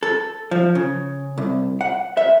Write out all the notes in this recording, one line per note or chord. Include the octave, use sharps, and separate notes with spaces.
A4
F3
C#3
C2
F#5
E5